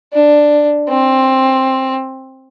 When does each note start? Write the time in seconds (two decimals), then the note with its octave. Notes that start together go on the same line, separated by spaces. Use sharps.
0.13 D4
0.89 C4